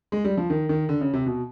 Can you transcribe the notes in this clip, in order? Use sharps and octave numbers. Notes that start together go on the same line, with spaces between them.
G#3
G3
F3
D#3
D#3
D3
C#3
C3
B2